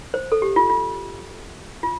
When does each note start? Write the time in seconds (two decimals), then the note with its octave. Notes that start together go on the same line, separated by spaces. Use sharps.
0.14 C5
0.32 A4
0.42 G4
0.56 F4
0.70 F4
1.83 F4